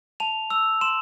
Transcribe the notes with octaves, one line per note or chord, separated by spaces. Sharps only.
A5 F7
E6 F7
C6 E7